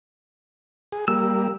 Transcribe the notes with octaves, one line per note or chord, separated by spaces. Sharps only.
G#4
G3 A#3 E6